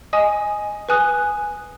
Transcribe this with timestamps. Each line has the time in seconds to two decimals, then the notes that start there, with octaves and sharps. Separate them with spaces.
0.13 D#5 G#5 D#6
0.89 B4 G#5 D#6 F#6